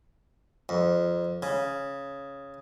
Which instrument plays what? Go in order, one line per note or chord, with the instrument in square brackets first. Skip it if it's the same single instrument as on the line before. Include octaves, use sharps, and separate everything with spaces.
[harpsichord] F2
C#3